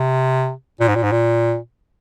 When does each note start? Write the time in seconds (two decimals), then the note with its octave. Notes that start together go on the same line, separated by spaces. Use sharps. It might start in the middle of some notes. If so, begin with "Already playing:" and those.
Already playing: C3
0.80 A#2
0.88 G#2
0.96 A#2
1.03 G#2
1.12 A#2